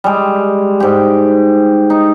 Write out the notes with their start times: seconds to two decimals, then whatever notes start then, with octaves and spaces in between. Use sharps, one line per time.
0.04 G3 G#3
0.80 G#2 G4
1.90 D#4